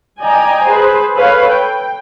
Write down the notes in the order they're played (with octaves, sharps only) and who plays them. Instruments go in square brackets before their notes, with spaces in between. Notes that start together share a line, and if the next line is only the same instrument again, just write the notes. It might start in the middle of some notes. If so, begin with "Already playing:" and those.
[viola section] D5 D#5 G5 G#5 A#5
G#4 B4 C5
A4 B4 C#5 F5
G5